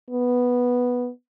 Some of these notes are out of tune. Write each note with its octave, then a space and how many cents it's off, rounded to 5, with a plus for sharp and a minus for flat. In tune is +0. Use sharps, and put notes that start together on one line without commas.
B3 -5